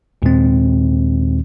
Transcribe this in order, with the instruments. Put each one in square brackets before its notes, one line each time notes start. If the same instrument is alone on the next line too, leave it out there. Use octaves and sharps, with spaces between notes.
[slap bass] D#2 G#3 [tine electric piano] A#2 C4